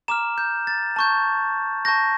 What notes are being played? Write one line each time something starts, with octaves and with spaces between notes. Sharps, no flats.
A#5 D6 F6 E7
G6
A6
A5 C#6 G6
A5 C#6 G6 A#6